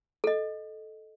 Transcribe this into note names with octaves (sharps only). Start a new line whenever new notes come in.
A4 D#5